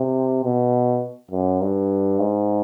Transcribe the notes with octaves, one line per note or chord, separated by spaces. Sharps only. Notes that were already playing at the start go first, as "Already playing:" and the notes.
Already playing: C3
B2
F#2
G2
G#2